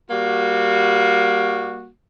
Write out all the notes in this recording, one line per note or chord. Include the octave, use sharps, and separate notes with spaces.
G3 A#3 F#4